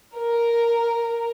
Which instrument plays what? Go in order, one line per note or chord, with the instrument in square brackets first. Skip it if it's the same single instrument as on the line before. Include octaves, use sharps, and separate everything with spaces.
[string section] A#4